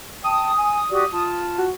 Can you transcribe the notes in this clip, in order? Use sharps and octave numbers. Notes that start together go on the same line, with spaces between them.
G5 A5 D#6
G#5
F#4 G4 D5
F4 A5
F#4